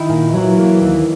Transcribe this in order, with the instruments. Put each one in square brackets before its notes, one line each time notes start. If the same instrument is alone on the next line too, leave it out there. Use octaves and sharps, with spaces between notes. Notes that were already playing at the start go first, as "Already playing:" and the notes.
Already playing: [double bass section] D#3 [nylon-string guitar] E4
[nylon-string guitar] A#2
[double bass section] E3 [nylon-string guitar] F#3
[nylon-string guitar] A#3
D#2